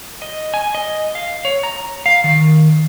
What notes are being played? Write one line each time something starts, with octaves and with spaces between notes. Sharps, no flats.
D#5
G#5
D#5
F5
C#5
A#5
F5
D#3